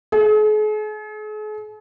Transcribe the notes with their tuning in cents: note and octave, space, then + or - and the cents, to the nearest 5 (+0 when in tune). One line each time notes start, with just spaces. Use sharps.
G#4 +45